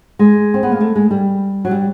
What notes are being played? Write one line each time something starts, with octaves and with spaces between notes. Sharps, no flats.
G#3
C4
B3
A#3
A3
G#3
G3
F#3
G3